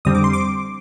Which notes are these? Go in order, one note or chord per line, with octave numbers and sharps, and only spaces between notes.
F2 D3 G3 C4 D#6
D6
C6
D6